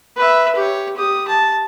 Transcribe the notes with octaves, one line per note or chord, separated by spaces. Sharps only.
B4 E5
G4 C#5
G4 D#6
A5